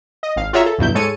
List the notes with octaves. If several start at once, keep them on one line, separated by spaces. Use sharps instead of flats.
D#5
G#1 F5
F4 F#4 G#4 C#5 E5 A#5
A4
D2 G2 B2 F#3 E4 G6
G#2 G#3 A4 C#5 C#7 D#7